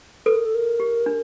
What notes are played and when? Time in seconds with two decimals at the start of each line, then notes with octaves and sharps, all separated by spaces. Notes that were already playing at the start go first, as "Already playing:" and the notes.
0.26 A4 B4
0.36 A#4
0.45 A4
0.55 A#4
0.80 G4
1.06 D4